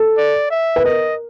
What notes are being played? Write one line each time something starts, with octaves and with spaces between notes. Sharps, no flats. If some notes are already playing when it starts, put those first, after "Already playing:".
Already playing: A4
D5
E5
B4
A#4 D#5